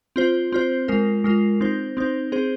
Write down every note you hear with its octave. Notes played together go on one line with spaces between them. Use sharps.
C4 F4 C5
C4 F4 C5
G#3 F4 A#4
G#3 F4 A#4
C4 D#4 C5
C4 D#4 C5
C4 G#4 C5